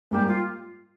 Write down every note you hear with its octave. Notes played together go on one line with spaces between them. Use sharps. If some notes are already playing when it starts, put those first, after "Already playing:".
G#2 G3 A#3 G4
F4